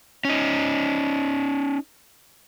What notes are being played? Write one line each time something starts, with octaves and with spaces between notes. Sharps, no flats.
C#4 D#4